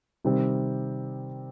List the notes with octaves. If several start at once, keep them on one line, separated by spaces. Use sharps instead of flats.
C3 D#3 G3 C4